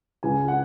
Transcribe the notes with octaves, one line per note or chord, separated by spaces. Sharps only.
C#2 G#5
F#5